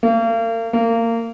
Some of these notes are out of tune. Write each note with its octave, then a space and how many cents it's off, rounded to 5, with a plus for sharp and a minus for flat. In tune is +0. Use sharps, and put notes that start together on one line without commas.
A#3 -40
A#3 -25